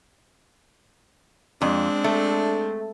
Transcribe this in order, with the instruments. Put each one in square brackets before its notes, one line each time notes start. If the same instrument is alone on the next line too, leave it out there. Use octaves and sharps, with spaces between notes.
[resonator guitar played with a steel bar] F2 [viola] G#3 C4 [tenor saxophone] D4
[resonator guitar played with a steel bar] A3